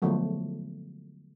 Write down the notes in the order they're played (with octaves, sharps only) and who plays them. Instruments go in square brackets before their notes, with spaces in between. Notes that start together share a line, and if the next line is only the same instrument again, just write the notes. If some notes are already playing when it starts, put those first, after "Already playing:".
[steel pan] D3 F3 F#3 G#3 A3 B3